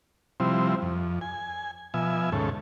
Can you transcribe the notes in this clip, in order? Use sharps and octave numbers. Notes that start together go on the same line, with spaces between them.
C3 F3 G3 C4 E4
F2
G#5
B2 F3 E5 G#5
D#2 G#2 C#3 A4